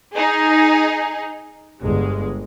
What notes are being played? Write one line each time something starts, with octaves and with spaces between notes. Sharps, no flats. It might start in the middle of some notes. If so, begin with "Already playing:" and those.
D#4 G#4
G1 G#3